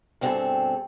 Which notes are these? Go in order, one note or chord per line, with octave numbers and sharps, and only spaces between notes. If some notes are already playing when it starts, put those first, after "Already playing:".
G2 B2 C4 F#4 G#4 A4